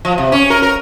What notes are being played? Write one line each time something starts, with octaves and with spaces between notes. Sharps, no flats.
F3
C3
C#4
A#4
A#4